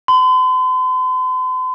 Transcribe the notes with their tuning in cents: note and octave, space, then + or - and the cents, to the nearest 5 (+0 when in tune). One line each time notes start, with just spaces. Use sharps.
C6 -45